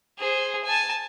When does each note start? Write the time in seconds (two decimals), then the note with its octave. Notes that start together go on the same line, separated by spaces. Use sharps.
0.19 G#4 C5
0.64 G#5 A5